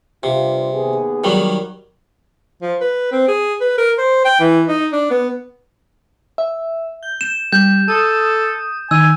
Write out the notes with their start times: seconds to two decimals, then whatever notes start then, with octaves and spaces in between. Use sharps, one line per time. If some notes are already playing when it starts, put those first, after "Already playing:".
0.23 G2 C3 F4
0.74 D#2 B3 G#4
1.24 D#3 F#3 G3
2.62 F3
2.81 B4
3.12 C4
3.28 G#4
3.60 B4
3.78 A#4
3.98 C5
4.25 G5
4.40 E3
4.68 D#4
4.92 D4
5.10 B3
6.38 E5
7.03 G6
7.21 E7
7.53 G3 G6
7.88 A4 D#6
8.91 D#3 G#5 E6